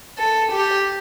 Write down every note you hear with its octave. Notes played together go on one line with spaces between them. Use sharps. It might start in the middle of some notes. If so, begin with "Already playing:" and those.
A4
G4